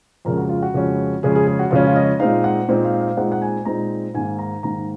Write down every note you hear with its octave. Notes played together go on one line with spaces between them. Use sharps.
F2 C#3 G#3 C#4 A#4
F#4
F4
F#4
F2 C#3 G#3 C#4
F2 C#3 G#3 C#4 G#4
G#4
G#4
F#4
F2 C#3 G#3 C#4 F4
F4
D#5
A#2 G#3 C4 D#4 F5
F#5
A#2 G#3 C4 D#4
F5
F5
A#2 G#3 C4 D#4 F#5
F#5
G#5
A#2 G#3 C4 D#4 A#5
G#2 D#3 A#3 G#5
A#5
G#2 D#3 A#3 A#5